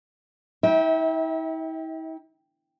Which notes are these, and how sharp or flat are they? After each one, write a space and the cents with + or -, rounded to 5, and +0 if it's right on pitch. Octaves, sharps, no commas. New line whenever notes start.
E4 -45 E5 -30 G5 +0